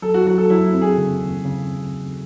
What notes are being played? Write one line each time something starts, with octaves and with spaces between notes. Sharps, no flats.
F#3 A4
F#4
F#3 F#4
A4
F#3 E4
E4
C4
G#4
C#3
D#2
C#3